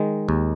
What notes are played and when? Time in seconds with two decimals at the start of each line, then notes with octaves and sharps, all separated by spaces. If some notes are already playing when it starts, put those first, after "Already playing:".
Already playing: D#3 G#3
0.29 D#2